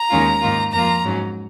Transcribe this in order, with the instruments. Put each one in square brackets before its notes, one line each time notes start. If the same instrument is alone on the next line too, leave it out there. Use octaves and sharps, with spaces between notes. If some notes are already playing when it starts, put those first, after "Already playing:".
Already playing: [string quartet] A#5
D#2 D#3 G#3 C#4 F4
G#2 D#3 A#3 F4
F2 F3 A#3 F4 A#5
G#2 F#3 C#4